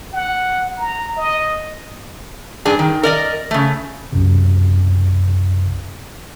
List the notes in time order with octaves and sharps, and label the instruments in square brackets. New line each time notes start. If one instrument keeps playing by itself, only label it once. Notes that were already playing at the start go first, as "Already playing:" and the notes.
[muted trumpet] F#5
A#5
D#5
[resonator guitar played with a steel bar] G2 D4 G#4
D#3
A#4 D5 D#5
C#3 A3
[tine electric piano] B1 F#2 C3